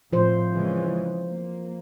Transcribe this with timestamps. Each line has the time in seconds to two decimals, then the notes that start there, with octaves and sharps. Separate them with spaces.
0.13 A2 F3 C5
0.50 C#3 E3 G#3
1.29 A#3